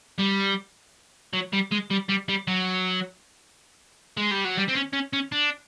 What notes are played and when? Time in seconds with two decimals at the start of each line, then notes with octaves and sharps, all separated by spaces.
0.19 G3
1.33 F#3
1.53 G3
1.71 G#3
1.90 G3
2.09 G3
2.29 G3
2.48 F#3
4.17 G#3
4.31 G3
4.45 F#3
4.58 G3
4.69 C4
4.75 C#4
4.93 C#4
5.13 C#4
5.32 D4